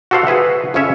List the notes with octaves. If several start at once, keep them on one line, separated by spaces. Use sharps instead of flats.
F#4 G4 A4 C5 F5 F#5
F#4 G#4 B4 E5
F2 C#3 C4 C#4 C#5 E5